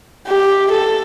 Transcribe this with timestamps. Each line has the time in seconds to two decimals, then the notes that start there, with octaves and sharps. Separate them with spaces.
0.27 G4
0.72 A4